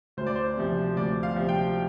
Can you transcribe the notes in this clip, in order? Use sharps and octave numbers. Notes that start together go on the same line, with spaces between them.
D2 C5
D5
C5
C3 F3
D2 D5
F5
C3 F3
G5